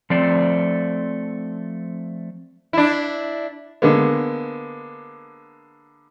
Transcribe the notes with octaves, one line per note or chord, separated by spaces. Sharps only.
F3 A3 C4 D5
D4 E4
D3 G#3 A#3 B3